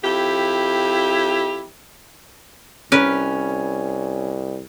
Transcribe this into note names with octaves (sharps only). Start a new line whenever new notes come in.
F2 E4 G4
C2 C#4 A#4 B4